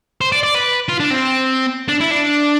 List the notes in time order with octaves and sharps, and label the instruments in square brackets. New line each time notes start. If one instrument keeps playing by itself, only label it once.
[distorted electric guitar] C5
D5
D5
B4
F4
D4
C4
D4
E4
D4